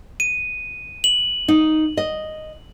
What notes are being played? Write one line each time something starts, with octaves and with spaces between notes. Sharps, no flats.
D#7
F#7
D#4
D#5